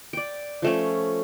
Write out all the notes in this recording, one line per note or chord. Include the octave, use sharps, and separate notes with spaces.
D5 G5
F3 A3 C#4